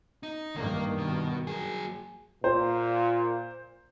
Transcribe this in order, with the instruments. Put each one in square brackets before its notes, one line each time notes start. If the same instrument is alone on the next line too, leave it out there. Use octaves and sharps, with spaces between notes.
[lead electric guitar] D#4
[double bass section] G2 D#3 [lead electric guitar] A#3
[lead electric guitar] B2
F#3 G#4
[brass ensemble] A#2 [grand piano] C5